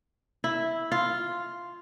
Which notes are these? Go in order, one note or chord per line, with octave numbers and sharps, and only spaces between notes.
E4
F4